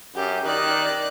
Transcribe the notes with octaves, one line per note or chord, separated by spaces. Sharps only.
F#2 G4
D#3 D5 F#6